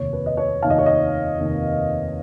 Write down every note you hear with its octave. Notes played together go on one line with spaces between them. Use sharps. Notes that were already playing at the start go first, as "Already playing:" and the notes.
Already playing: F1 D#2 D#3 C#5
B4
D#5
C#5
F1 D#2 D#3 F5
D#5
C#5
D#5
F1 D#2 D#3